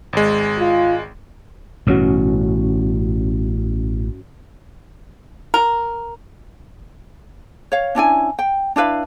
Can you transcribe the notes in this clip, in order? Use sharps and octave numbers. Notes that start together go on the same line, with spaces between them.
G#1 G#3
F4
A1 G2 B2 C#4 F#4
A#4
C#5 F5
C#4 D4 E4 G#5
G5
D4 E4 B4 F5